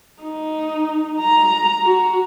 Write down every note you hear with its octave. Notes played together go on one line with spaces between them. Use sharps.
D#4
A#5
F#4